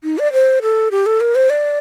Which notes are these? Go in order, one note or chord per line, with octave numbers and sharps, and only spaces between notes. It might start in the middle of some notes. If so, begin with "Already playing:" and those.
D#4
D5
C5
A4
G4
A4
A#4
C5
D5